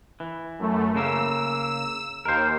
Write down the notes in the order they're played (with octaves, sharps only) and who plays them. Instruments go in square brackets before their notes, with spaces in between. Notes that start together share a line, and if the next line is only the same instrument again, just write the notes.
[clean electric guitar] E3
[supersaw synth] F#2 A3
[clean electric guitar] C#3 A#3 [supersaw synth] E6
[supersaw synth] D#2 [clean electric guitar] A#4 C5